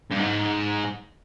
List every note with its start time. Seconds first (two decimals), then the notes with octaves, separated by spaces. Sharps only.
0.11 G2
0.19 G#2